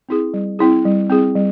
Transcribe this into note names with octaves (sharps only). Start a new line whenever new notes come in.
C4 E4 G#4
G3
C4 E4 G#4
G3
C4 E4 G#4
G3